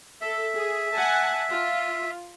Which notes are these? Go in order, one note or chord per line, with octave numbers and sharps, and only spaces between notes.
A4 E5
G#4
F#5 G#5 A5
F4